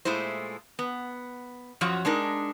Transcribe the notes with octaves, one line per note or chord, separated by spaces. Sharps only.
A#2 G#3 A3 E4 C5
B3
F#2 F3 F#3 F#4 C#5
G#3 D4 D#4 A#4